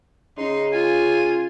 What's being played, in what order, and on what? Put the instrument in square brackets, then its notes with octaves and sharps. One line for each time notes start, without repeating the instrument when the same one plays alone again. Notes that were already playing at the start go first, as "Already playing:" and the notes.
[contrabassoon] C#3 [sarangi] D#4 [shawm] C6
[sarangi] F4 [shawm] G#5